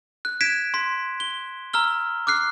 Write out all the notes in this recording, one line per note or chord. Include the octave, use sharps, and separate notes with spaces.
F#6
G#6 B6 D7 E7
C6 B6
G7
A#5 E6 F6 G7
D6 F6 F#6 C7